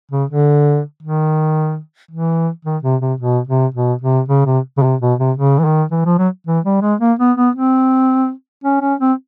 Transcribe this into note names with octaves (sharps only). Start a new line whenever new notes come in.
C#3
D3
D#3
E3
D#3
C3
C3
B2
C3
B2
C3
C#3
C3
C#3
C3
B2
C3
C#3
E3
D#3
E3
F3
F#3
E3
G3
G#3
A#3
B3
B3
C4
C#4
C#4
C4